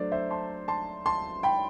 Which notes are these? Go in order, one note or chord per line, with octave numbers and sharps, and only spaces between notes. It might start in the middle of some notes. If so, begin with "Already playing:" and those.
Already playing: F#3 A3 D4 C5 D5
C5 E5
A5 C6
A5 C6
A5 C6
G5 B5